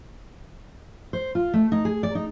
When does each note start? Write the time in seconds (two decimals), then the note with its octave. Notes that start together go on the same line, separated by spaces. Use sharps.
1.13 C5
1.35 F4
1.54 A3
1.72 D#4
1.85 G#4
2.03 D5
2.15 D#4